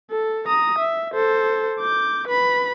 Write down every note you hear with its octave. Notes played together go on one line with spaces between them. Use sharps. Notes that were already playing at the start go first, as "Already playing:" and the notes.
A4
A#5 D#6
E5
A4 C5
D6 G6
B4 B5